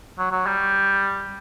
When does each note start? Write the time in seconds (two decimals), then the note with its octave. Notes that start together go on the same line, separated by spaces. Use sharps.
0.18 F#3
0.31 F#3
0.46 G3